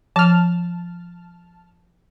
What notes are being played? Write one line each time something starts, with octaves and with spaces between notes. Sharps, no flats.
F3 A5 F6